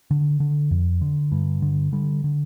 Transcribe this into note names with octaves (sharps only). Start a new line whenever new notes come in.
D3
D3
F2
D3
G2
D3
D3 G3
D3